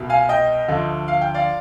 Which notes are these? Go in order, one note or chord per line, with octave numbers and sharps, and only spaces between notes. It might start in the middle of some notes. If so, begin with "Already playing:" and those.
Already playing: C2 B2
F5 G#5
D#5 G5
D2 D3 F3
F5
G5
D5 F5